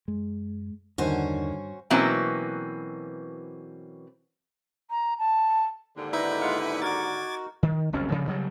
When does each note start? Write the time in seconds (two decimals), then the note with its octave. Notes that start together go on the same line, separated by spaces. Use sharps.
0.08 F#2 G#3
0.98 E2 G2 D3 D#3 C#4 F#4 C5
1.90 B2 E3 F#3 A#3 C4 C#4
4.90 A#5
5.19 A5
5.97 D#2 G#2 D3
6.13 D#4 E4 B4 E5
6.41 G#3 F4 F5 F#5
6.60 G#5
6.82 F#4 A#4 D6 G#6 A6
7.63 D#3
7.93 F#1 C2 F2 C#4
8.10 G2 C#3 F3
8.27 C#3 F#3 G3